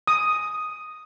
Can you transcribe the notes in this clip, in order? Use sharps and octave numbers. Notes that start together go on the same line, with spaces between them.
D#6